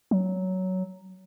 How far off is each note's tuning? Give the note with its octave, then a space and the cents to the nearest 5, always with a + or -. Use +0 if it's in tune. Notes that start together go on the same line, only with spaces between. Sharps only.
F#3 +10